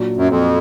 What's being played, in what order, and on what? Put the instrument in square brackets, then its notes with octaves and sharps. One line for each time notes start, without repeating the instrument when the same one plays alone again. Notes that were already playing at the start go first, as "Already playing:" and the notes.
Already playing: [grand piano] A#2 F#3 D4 F#4
[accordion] F#2
F2